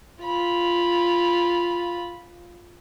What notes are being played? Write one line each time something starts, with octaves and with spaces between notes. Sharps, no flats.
F4 B5